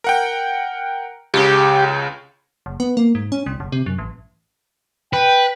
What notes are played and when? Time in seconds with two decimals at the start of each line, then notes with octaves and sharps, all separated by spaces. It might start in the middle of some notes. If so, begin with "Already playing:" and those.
0.04 A#4 F#5 G5
1.34 C#2 C#3 G4
2.66 F#1
2.80 B3
2.97 A#3
3.15 G#2
3.32 C#4
3.46 C2
3.60 F#1
3.72 C3
3.86 F#2
3.98 A1
5.13 B4 G5